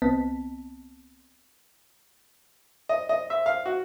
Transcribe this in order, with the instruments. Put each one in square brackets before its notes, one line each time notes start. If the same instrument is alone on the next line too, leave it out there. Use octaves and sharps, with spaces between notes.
[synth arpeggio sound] C2 B3 C4 D#5 A5 B6
[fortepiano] D#5
D#5
E5
F5
F#4